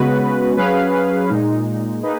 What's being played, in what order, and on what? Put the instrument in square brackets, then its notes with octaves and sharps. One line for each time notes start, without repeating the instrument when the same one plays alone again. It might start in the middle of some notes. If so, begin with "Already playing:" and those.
Already playing: [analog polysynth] C#3 G#3 B3 F#4 B4
F#3 C#4 G#4 B4 F5
A#2 G#3 D#4
A#3 D#4 G#4 B4 D#5